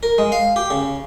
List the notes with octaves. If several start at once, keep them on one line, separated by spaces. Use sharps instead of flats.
A#4
G#3
F5
G4
C#3